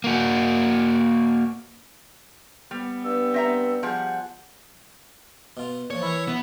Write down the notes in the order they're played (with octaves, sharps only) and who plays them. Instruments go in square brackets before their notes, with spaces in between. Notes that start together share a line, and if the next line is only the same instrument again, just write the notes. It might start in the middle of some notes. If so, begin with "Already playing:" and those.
[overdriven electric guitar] A#3 F#4
[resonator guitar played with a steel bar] G3 [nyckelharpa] B3
[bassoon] G2 [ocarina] E6
[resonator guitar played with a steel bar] C4 E5 A#5
[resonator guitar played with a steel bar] F3 G3 G#4 [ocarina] F#5
[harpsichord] B2 F4
[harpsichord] A#2 F3 [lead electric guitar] C#5
[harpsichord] E3 A#4 [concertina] E4 E5
[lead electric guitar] B3